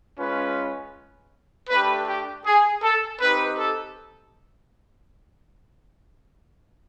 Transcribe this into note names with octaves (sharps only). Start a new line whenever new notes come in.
G#3 C#4 F4 B4
A3 D4 G4 B4
G4
G#4
A4
C4 D#4 G4 B4
A4